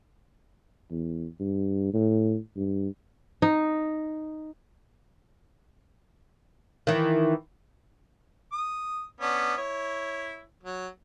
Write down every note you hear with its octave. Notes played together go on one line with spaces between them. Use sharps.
E2
G2
A2
G2
D#4
D#3 E3
D#6
B3 C#4 D4
E4 C#5
F#3